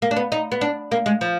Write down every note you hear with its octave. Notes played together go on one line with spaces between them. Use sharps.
A#3
D4
B3
D#4
B3
D4
A#3
G#3
F3